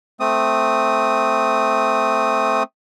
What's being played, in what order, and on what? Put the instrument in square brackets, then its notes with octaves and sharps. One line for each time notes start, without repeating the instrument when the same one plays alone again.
[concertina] A3 C4 D#6